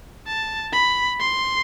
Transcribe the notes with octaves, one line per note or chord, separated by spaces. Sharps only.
A5
B5
C6